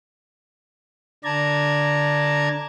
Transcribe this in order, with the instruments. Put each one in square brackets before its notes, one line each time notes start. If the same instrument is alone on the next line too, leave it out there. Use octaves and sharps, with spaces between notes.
[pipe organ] D3 D4 D5 A5 A#5 G#6